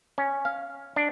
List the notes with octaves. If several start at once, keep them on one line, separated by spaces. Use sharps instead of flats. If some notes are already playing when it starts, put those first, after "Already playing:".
C#4
F5
D4